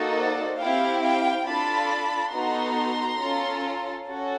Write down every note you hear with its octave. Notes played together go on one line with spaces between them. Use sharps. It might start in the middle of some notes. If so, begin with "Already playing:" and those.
Already playing: A#3 D#4 F#4 A4
C5 D5
C4 E4 G4 F5 G5
F5 G5
D4 F4 A4 A5 B5
B3 D#4 F#4 A4 A#5 C6
C#4 F4 A4
C#4 F#4 A4